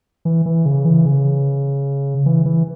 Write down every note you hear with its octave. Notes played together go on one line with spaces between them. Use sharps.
E3
E3
C#3
E3
C#3
E3
E3